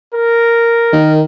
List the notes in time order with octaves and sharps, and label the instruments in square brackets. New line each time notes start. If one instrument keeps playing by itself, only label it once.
[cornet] A#4
[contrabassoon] D#3